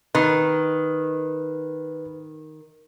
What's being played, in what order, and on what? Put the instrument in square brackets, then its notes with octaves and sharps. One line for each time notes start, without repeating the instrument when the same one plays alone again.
[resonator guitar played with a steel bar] D#3 [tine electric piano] B4